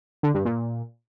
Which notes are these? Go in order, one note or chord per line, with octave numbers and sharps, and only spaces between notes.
D3
G2
A#2